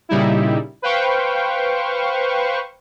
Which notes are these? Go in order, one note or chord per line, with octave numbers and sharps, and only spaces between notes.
A#2 C#3 G3 D#4 E4
B4 C5 F5 G5 C#6